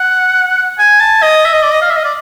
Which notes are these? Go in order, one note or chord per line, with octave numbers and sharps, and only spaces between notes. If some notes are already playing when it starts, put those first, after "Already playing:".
Already playing: F#5
G#5
A5
D#5
E5
D#5
D5
D#5
F5
E5
D#5
D5